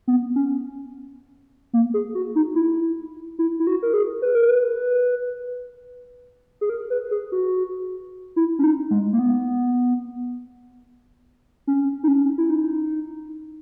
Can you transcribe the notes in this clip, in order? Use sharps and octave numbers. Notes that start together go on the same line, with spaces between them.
B3
C#4
A#3
G#4
F#4
D#4
E4
E4
E4
F#4
A#4
G#4
B4
A#4
B4
G#4
A#4
B4
G#4
F#4
E4
C#4
D#4
G#3
A#3
B3
C#4
D#4
C#4
E4
D#4